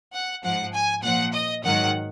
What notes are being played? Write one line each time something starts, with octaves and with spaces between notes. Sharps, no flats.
F#5
G#2 F3 F#5
G#5
A#2 F3 F#5
D#5
G#2 D#3 F#3 F#5